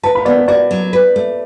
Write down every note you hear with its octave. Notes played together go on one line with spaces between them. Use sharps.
B4 A5
B5
B3 D5
B4
F#4 D5
F#3
B4
A3